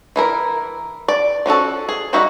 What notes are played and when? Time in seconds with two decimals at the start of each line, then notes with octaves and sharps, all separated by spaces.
0.16 E3 E4 A#4
1.08 D5
1.46 F3 C#4 F#4 A4
1.89 G#4
2.13 G3 A#3 D#4 F#4 E5